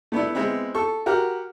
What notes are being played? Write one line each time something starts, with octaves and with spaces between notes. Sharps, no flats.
A3 B3 D4 E4
G#3 B3 C4 E4
A4 C#6
F#4 G4 A#4 F#5